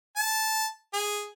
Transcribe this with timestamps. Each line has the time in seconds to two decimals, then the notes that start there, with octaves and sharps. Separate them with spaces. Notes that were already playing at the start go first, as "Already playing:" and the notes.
0.16 A5
0.94 G#4